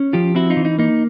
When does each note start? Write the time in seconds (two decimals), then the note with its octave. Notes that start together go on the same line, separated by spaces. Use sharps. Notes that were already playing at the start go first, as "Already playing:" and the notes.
Already playing: C#4
0.13 F3 F4 G4
0.35 C4 E4 F#4
0.50 D#4 F4
0.57 E3
0.65 D#4
0.78 A#3 D#4